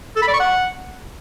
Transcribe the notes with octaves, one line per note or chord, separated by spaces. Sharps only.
A4
B5
D5
C#6
F#5